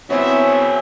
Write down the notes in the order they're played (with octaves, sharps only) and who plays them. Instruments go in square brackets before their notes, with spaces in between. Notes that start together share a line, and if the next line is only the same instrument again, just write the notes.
[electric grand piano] B3 C4 E4 [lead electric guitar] F#4 G#4 [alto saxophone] C#5 [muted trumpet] E5